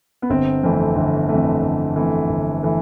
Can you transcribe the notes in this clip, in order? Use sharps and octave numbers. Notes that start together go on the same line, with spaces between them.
B3
G1 C4
F2 E3 A3
G1
F2 E3 A3
G1
F2 E3 A3
G1
E3 A3